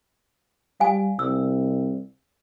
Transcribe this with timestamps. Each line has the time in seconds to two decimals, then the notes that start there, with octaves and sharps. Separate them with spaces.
0.80 G3 F5 G#5
1.19 C2 E6